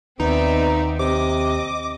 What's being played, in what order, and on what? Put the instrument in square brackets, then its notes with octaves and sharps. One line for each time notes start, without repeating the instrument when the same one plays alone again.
[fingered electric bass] D#2 [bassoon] B3 [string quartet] C4 D5 E5 [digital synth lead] D#4
[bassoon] C3 [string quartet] D#5 [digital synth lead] D6